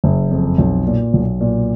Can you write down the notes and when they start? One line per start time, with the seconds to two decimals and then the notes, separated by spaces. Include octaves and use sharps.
0.04 F#1
0.31 F2
0.58 B1
0.87 A#2
1.14 B1
1.40 A#2